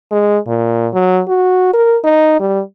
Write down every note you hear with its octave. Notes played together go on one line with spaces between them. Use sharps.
G#3
A#2
F#3
F#4
A#4
D#4
G3